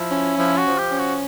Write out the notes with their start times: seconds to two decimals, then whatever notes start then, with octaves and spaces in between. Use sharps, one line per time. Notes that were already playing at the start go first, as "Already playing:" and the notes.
Already playing: F3 E4
0.11 C#4
0.37 F3 E4
0.58 F#4
0.65 F3
0.78 G4
0.91 C#4
0.99 F#4